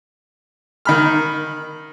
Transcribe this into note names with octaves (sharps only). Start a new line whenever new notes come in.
D#3 B5 F6